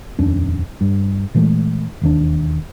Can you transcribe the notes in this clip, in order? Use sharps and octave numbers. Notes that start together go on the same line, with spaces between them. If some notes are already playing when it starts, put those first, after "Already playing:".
D#1 F2 C#4 D4
G2
A#2 E3 G#3 A3
E1 D#2 D4